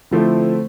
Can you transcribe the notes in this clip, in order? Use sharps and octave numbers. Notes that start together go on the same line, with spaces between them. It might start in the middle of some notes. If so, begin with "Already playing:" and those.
D3 F3 A3 C4 E4